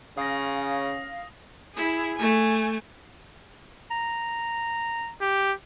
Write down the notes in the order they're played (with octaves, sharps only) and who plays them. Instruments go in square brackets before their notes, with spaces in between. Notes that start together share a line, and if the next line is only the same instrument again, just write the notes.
[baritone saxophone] C#3 [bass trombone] C#4 [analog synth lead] F5 [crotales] D#6 A#6
[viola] E4 G#4
A3 G#5
[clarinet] A#5
[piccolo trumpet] G4